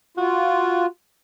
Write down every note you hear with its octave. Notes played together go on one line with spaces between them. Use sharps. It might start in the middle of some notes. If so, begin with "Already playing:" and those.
F4 F#4